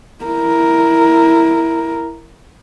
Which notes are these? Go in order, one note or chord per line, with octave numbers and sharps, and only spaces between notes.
E4 A#4